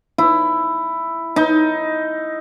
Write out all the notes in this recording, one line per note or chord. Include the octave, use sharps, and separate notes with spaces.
E4
D#4